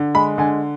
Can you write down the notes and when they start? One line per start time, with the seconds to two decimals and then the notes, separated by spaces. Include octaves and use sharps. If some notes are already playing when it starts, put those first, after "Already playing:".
Already playing: D3
0.15 G#3 B5
0.38 D3 G#5